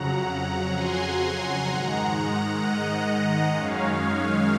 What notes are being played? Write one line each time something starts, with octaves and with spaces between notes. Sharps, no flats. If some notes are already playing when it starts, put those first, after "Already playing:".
Already playing: F2 C#3 F#3 F#5 A#5
G#5 C6
G#5 C6
G#2 D#3 G#3 F#5 A#5
D#5 F#5
F#2 D#3 G#3 C#4 C#5 F5